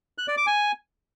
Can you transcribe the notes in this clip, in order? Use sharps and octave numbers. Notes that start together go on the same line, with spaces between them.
F#6
D5
D6
G#5